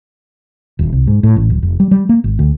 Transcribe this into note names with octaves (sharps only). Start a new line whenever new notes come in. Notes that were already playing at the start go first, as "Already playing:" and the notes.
D#1
C2
G#2
A2
A1
D1
F1
G3
G3
A#3
G#1
D2